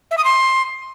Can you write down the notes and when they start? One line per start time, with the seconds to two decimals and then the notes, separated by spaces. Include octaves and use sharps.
0.11 E5
0.18 D#6
0.24 C6